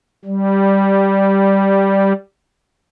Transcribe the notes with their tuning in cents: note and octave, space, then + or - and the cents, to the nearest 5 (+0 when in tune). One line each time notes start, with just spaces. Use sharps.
G3 -5